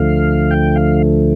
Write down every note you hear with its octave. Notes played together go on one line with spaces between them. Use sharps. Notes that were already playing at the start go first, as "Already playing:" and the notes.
Already playing: D2 D3 F3 A3 F5
G5
F5